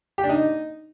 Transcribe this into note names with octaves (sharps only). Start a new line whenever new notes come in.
G4
D4
D#4